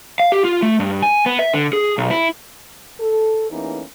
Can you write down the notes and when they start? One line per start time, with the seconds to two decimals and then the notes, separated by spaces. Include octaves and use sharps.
0.20 F5
0.32 G4
0.45 F4
0.63 A3
0.80 G2
1.02 G#5
1.26 B3
1.39 E5
1.53 D3
1.73 G#4
1.98 B1
2.11 E4
3.00 A4
3.50 E2 E3 A3 A#3 C#4 D#4